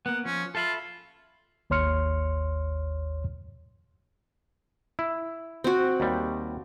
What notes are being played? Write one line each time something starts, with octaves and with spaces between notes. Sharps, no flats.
A#3 B3 F#5
F3 C#4
F4 A4 E5 B5
G#1 D#2 C#5 C6 F6 C#7
E4
C4 F#4
D#2 G3